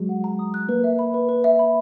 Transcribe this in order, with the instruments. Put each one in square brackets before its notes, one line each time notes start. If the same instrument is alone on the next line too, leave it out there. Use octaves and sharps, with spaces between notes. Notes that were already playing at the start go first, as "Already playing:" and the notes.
Already playing: [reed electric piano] F#3 G#3
[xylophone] F#5
A#5
D#6
F#6
[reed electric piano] A#3 [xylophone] B4
[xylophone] E5
B5
B4
B4
E5
B5